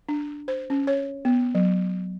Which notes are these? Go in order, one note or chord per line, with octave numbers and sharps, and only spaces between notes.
D4
C5
C#4
C#5
B3
F#3